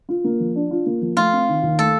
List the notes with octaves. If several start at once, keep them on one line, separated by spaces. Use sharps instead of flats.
F4
A#3
F3
D4
F4
A#3
F3
A3 F4
C4
D#3
D#2
A3 A4